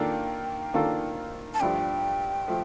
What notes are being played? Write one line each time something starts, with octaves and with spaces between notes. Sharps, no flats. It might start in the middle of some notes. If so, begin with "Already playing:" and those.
Already playing: D#3 A#3 D4 F4 A4 G5
D#3 A#3 D4 F4 A4
A5
G2 F3 A3 D4 G5
F3 A3